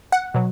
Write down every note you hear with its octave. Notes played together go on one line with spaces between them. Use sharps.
F#5
B2 F#3